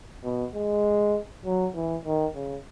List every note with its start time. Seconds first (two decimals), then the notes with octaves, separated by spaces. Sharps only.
0.24 B2
0.54 G#3
1.45 F#3
1.75 E3
2.05 D#3
2.35 C#3